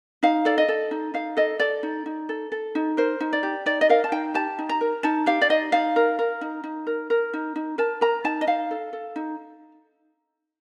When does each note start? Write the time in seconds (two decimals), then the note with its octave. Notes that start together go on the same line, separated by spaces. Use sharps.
0.23 D#4 F5
0.45 A4 D5
0.58 D#5
0.68 A4
0.91 D#4
1.14 D#4 F5
1.37 A4 D#5
1.60 A4 D5
1.83 D#4
2.06 D#4
2.29 A4
2.52 A4
2.75 D#4
2.97 A#4 C5
3.20 D#4
3.33 D5
3.43 G4
3.66 D#4 D5
3.81 D#5
3.89 A#4 F5
4.04 A5
4.12 D#4 G5
4.34 G4 A5
4.59 D#4
4.69 A#5
4.81 A#4
5.03 D#4 A5
5.26 G4 F5
5.41 D5
5.50 D#4 D#5
5.72 D#4 F5
5.96 A#4
6.19 A#4
6.41 D#4
6.64 D#4
6.87 A#4
7.10 A#4
7.33 D#4
7.56 D#4
7.78 A#4 A5
8.01 A#4 A#5
8.24 D#4 A5
8.41 D#5
8.47 D#4 F5
8.71 A4
8.93 A4
9.16 D#4